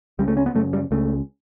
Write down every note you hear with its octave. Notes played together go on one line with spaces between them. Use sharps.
C#2 C#3 G3
A3
C#4
B3
F#2 C#3 A3
G3
C#2 C#3 A3